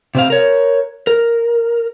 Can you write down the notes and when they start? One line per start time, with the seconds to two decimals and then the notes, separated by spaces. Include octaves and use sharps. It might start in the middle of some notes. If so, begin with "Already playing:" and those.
0.15 C3 C4 F5
0.30 A#4 C#5
1.07 A#4